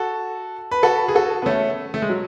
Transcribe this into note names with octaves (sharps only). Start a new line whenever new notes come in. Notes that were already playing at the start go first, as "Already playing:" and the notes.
Already playing: F#4 A4
B4
F#4 A4
G#4
F#4 A4
B3
A3 C#4
A3
G#3
F#3